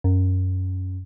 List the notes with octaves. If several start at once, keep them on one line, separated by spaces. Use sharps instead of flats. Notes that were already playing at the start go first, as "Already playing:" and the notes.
F#2